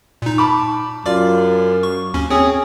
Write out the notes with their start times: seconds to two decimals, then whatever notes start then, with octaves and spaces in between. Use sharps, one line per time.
0.22 A#2 D#4
0.38 A5 B5 D6
1.06 F#2 F4 D5 D6
1.83 C#6
2.14 D#2 C#4
2.31 C4 C#4 G#4